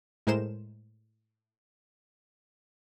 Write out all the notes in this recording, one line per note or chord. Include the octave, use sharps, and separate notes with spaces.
A2 G#3 A#4 C5 E7